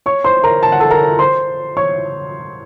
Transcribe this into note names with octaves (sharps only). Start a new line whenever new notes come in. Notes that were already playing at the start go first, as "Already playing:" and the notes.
C#5 C#6
C5 C6
A#4 A#5
A5
F#5
A4 A5
A#4 A#5
C5 C6
C#5 C#6